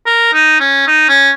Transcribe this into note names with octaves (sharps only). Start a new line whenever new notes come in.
A#4
D#4
C#4
D#4
C#4